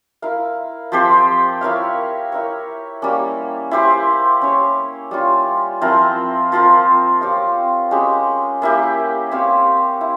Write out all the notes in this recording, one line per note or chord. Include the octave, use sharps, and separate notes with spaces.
E4 A#4 F5
F3 C4 G4 C5
E4 A#4 C#5 F5
E4 A#4 C#5
G3 A#3 C#4
E4 G4 C5
C#4 G4 C#5
G3 C#4 F4
F3 C4 E4 A#4
F3 C4 F4 A#4
C4 G4 C#5 F5
G#3 C#4 G4
A#3 E4 G4
C4 G4 C#5 F5
E4